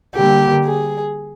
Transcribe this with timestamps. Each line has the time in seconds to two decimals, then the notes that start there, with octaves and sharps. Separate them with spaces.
0.15 D3 G3 A#3 G4
0.65 G#4